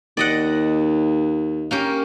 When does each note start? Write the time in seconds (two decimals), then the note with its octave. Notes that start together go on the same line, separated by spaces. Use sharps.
0.17 D#2 D5 D#5 F#5
1.71 A#3 C#4 G4